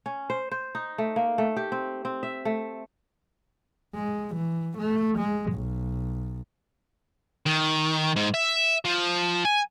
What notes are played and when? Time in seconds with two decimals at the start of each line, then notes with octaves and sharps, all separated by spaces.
0.06 C#4
0.30 C5
0.51 C5
0.75 D#4
0.98 A3
1.16 A#3
1.38 A3
1.57 G4
1.72 C4
2.05 C4
2.23 E5
2.45 A3
3.94 G#3
4.35 E3
4.78 A3
5.18 G#3
5.52 B1
7.46 D#3
8.16 G#2
8.34 E5
8.85 F3
9.45 G#5